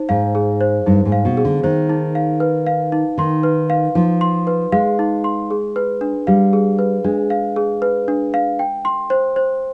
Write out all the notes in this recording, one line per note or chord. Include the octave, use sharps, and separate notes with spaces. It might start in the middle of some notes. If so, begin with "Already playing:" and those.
Already playing: D#4 C5
G#2 F5
G#4
C5
G2 D#4
G#2
F5
B2
G#4
D3
D#3 C5
D#4
F5
B4
F5
D#4
D#3 C6
B4
F5
F3 D#4
C6
B4
G#3 F5
D#4
C6
G#4
B4
D4
G3 F5
G#4
B4
G#3 D4
F5
G#4
B4
D4
F5
G5
C6
C5
C5